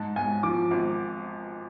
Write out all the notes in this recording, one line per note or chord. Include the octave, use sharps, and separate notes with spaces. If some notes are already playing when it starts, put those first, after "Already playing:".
Already playing: G#2 A5
G#2 G#5
F3 D6
G#1